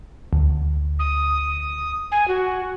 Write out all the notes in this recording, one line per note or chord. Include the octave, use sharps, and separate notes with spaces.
D2
D#6
G#5
F#4